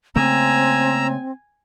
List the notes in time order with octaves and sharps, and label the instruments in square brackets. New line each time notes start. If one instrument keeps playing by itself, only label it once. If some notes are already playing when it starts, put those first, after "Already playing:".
[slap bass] C#3 A3 A#3 [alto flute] C4 [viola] G#5 [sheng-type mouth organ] A#5 E6